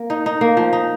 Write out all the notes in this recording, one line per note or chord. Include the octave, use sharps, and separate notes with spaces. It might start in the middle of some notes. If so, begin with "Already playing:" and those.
Already playing: A#3
D#4
D#4
A#3
F3
D#4